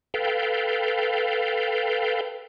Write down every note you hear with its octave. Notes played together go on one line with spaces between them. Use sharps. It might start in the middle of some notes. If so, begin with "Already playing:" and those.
A4 B4 F5 G5